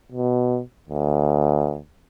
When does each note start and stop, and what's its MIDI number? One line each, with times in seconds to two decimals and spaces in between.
0.12 0.60 47
0.89 1.78 38